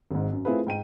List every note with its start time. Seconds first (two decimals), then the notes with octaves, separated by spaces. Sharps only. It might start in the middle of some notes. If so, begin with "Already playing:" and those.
0.11 G#1 G#2
0.32 F#2
0.45 A3 C4 E4 F4 G#4 B4
0.67 G#2 G5 D#7